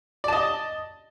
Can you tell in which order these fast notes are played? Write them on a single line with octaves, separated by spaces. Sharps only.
D5 A5 D#5